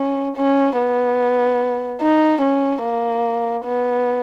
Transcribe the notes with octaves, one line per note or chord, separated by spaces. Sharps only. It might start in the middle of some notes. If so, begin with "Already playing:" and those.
Already playing: C#4
C#4
B3
D#4
C#4
A#3
B3